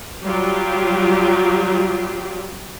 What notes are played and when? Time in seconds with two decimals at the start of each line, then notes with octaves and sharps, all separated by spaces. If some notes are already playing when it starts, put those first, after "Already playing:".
0.22 F#3 G3 F4 G4